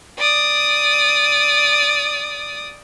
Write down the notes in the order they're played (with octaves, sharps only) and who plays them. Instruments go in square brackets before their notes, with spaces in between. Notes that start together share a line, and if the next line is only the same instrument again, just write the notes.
[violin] D5 D#6